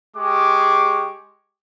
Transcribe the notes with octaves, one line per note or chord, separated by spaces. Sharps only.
G#3 G4 G#4 C#6 D6